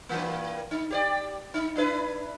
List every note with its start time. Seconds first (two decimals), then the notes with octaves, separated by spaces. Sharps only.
0.09 G2 E3 A#3
0.71 D#4
0.91 G4 C#5 D5
1.54 D#4
1.76 D4 E4 B4